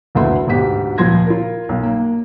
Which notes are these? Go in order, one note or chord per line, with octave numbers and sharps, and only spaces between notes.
F#1 D2 A3 B4 E5 C6
D2 G#2 B2 G4 B6
D#1 C#2 F3 C6 G#6 A#6
F4 A#4
B1
A#3